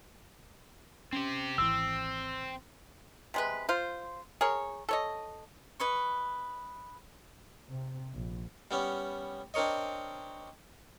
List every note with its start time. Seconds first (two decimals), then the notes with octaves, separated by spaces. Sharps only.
1.13 C4 C#4 G4
1.58 G#1 E3 C4 E6
3.34 C3 G#3 B4
3.69 F4 C5
4.41 G#4 A#4 C#5
4.89 A4 C#5 D#5
5.80 B4 D#5 C#6
7.70 C3
8.14 A#1
8.71 G3 B3 C#4
9.54 C4 D4 A#4 C#5 D#5